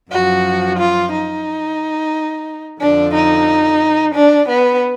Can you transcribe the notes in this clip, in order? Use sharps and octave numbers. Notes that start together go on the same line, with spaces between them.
F#2 F3 F#4
F4
D#4
F2 D3 F3 D4
D#4
D4
B3